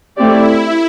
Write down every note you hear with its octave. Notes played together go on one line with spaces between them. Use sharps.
A3 C4 E4 G4 D5